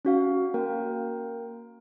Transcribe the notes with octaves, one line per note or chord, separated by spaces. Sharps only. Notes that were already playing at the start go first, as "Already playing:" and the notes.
C#4 F#4 F5
A#3 A#4 G5